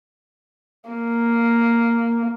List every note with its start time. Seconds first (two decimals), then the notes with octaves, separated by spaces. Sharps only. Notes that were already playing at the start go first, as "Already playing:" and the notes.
0.90 A#3